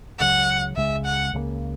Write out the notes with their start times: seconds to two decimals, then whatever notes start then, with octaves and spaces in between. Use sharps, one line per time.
0.19 C#2 C#3 F#3 F#5
0.76 C#2 C#3 G#3 E5
1.05 F#5
1.33 C#2 C#3 F#3 A#3